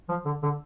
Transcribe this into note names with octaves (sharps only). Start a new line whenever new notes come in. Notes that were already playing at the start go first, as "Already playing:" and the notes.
F3
D3
D3